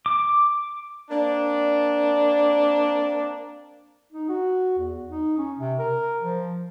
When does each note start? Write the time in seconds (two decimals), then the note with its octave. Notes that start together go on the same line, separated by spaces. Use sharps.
0.06 D6
1.10 A#3 C4 D4
4.12 D#4
4.29 F#4
4.78 E2
5.09 D#4
5.38 C#4
5.59 C3
5.79 A#4
6.22 F3